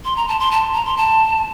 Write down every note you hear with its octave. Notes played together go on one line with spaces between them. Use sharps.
C6
A#5
A5
C6
A5
A#5
C6
A5